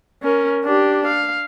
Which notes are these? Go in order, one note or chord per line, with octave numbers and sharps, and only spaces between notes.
C#4 A#4
D4 G4
F5